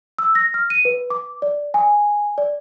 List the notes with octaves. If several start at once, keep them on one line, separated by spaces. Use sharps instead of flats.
E6
A#6
F6
D#7
B4
D6
D5
G#5
D5